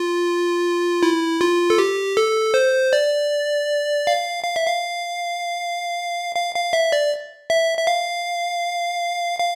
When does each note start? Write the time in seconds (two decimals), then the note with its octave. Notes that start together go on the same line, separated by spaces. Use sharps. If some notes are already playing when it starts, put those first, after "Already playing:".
Already playing: F4
1.03 E4
1.41 F4
1.70 A4
1.78 G4
2.17 A4
2.54 C5
2.93 D5
4.07 F5
4.44 F5
4.56 E5
4.67 F5
6.35 F5
6.55 F5
6.73 E5
6.92 D5
7.50 E5
7.78 E5
7.87 F5
9.40 F5